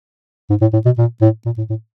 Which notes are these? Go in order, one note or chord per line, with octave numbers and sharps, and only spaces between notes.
G#2
A2
A2
B2
A#2
A2
A#2
A2
A2